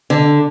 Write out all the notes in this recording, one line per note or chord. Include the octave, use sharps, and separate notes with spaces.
D3